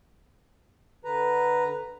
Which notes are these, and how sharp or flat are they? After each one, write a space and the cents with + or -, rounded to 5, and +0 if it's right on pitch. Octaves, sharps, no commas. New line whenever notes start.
D3 +0 B4 +0 A#5 +0